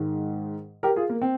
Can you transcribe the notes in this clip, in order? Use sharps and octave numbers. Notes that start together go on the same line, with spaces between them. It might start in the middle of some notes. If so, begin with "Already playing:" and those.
Already playing: G#2 D#3 G#3
G4 A#4
F4 G#4
A#3
C4